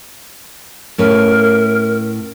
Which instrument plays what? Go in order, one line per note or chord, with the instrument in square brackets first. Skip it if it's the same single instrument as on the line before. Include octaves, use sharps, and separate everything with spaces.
[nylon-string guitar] A2 C#4 B4 [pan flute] A#4